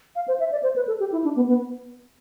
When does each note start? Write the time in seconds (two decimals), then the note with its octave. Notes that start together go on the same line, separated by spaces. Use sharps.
0.15 F5
0.28 C5
0.40 E5
0.51 D5
0.63 C5
0.76 B4
0.87 A4
1.00 G4
1.12 E4
1.24 D4
1.36 B3
1.48 B3